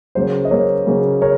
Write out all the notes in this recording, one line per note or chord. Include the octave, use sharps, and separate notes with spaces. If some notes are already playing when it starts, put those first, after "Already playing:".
C#3 F#3 A#3 C#4 C5
D#5
C#3 F#3 A#3 C#4 A#4 C#5
C#3 F#3 A#3 C#4
C#3 A#4 C#5